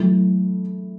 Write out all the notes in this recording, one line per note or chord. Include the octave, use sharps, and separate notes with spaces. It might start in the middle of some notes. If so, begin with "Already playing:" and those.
Already playing: E3 F#3 A3 E4